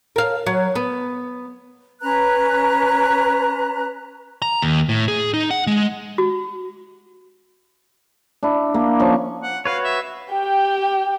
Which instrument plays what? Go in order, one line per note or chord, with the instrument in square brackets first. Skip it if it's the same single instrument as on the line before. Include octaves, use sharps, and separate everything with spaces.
[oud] A#4 F5
F#3
B3
[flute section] C#4 B4 A#5 F#6
[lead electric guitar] A#5
D#2
A2
G#4
D#4
F#5
G#3
[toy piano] F#4
[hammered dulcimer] D4 E4
A#3
F3 C#4 C#6
[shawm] F#5
[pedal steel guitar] F#4 B4 C#5 [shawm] F5
[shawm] E5
[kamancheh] G4 G5